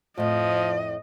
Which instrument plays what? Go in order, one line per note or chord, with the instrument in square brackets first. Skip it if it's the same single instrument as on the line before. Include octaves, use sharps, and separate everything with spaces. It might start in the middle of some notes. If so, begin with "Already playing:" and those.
[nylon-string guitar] F2 A2 [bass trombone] F3 [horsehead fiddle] D#5